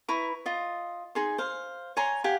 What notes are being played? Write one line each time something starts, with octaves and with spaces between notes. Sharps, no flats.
E4 B4 A#5 C#6
F4 D#5
D#4 G#4 C6
C5 F5
C#5 G#5 A#5 C6
G4 F5 F#5 G#5